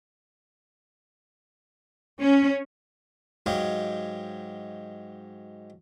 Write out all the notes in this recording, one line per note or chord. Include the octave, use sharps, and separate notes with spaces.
C#4
G#2 F#3 G4 C#5 D#5 F5